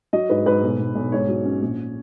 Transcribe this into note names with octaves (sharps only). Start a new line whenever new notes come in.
F#3 D#5
G#2 B4
G#2 B4
B1
B1
B1
G#2 C#5
F#3
C#4
A#1